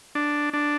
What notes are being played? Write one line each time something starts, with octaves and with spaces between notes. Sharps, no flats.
D4
D4